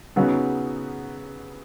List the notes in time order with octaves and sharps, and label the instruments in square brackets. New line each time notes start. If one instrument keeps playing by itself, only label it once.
[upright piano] C#3 F#3 B3 D#4 F#4